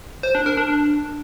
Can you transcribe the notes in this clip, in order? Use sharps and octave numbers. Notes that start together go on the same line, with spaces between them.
C5
D4
A#4
D4